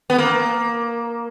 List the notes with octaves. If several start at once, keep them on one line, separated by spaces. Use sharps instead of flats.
B3
A#3